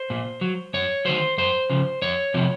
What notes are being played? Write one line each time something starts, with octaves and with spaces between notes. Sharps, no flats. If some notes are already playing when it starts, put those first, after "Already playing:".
Already playing: C5
A#2
F#3
F#2 C#5
D#3 F#3 C5
F#2 C5
C#3 F3
F2 C#5
C3 F3